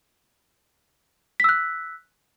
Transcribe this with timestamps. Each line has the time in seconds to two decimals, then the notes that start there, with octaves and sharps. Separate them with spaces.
1.40 B6
1.44 E6
1.49 F#6